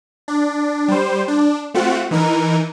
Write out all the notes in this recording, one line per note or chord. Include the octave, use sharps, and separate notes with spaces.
D4
G3 C5
D4
A3 C4 F4 F#4 F#5
E3 D#4 A#4